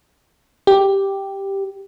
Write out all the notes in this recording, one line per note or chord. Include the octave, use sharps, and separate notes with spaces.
G4